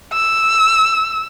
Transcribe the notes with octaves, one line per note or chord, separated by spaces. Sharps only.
E6